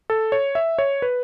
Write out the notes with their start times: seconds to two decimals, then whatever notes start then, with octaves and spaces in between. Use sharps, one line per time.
0.10 A4
0.32 C#5
0.55 E5
0.79 C#5
1.02 B4